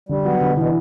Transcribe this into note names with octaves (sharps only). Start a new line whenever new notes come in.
D3 G3
F#3 B3
B2 D3
B2 E3